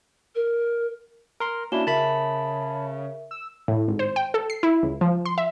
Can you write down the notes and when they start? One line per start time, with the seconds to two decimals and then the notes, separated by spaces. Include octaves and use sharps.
0.35 A#4
1.40 A#4 C6
1.72 A#3 C#4 D4 E4 F#4 E7 G7
1.87 C#3 A#4 E5 A5 B5
3.31 E6
3.68 A2
3.88 G#1
3.99 C5
4.16 G5
4.34 A4
4.50 C7
4.63 E4
4.83 C#2
5.01 F3
5.26 C6
5.38 E5